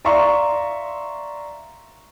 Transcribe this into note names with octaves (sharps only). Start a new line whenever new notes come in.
D5 E5 F5 A#5 C6 C#6